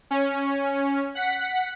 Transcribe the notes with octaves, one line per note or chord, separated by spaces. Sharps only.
C#4
F#5 B6